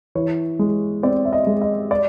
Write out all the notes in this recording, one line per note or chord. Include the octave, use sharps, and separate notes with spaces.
E3 C#5
G#3
C4 D5
E5
D#5
G#3
D#5
D5